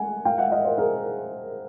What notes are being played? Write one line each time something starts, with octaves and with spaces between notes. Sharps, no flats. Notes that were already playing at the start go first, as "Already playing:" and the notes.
Already playing: F#5 G#5
F5 G5
E5 F#5
D#5 F5
A#4 C5
G#4 A#4